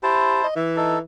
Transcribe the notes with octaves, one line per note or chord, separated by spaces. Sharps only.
E4 G4 C5 A5
D#5
E3 E5
D#4 A4